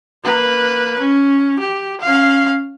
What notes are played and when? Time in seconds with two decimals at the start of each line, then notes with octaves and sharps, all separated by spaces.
0.24 A#3 B4
0.99 C#4
1.60 G4
2.02 C#4 F5